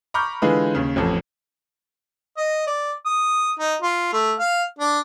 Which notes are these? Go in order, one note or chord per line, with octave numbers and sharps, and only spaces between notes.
A#5 B5 C#6 D6 F6 G6
D3 E3 G#3 F4 G#4 B4
D#2 C#3
A1 F2 A4
D#5
D5
D#6
D#4
F4
A3
F5
D4